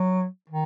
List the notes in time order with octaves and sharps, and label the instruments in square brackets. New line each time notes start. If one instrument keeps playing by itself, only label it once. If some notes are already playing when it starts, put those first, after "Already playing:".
Already playing: [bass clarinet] F#3
D#3